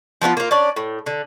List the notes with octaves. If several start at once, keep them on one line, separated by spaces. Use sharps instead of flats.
F3 A3 B3 F4
A#3 F4
C#4 D4 D5
A2
D3